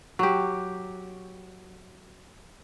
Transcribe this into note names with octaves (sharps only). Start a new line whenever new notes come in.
F#3 G4